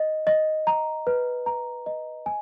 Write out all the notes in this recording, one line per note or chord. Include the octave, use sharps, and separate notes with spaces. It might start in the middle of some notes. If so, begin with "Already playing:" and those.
Already playing: D#5
D#5
A#5
B4
A#5
D#5
G#5